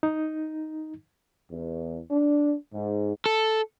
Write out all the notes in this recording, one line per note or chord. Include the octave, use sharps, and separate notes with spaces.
D#4
E2
D4
G#2
A4